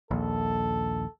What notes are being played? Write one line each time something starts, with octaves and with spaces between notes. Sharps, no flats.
A#1 D#2 A4